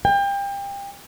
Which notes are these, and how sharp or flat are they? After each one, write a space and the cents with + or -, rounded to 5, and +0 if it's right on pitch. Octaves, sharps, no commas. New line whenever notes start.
G5 +30